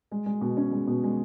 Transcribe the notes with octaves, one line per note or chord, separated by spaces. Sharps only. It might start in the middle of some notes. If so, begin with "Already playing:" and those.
G#3
G#3
B2
C#4
G#3
B2
G#3